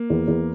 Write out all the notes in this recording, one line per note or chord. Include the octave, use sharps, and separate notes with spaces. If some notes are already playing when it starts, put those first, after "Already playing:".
Already playing: A#3
E2
E2